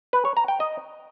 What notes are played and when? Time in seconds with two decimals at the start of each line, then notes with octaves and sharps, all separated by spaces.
0.13 B4
0.25 C#5
0.37 A#5
0.48 G5
0.60 D#5